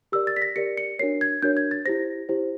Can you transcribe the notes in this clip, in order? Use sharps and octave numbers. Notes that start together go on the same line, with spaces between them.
G4 A#4 D5 E6
A6
B6
A#6
G4 A#4 D5 C#7
C#7
D4 F#4 A#4 C#5 C7
G#6
D4 F#4 A#4 C#5 G6
G#6
A6
E4 G4 C5 A#6
E4 G4 C5